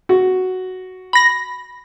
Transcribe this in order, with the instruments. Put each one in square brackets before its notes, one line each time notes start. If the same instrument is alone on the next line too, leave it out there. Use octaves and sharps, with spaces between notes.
[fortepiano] F#4
[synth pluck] B5 A#6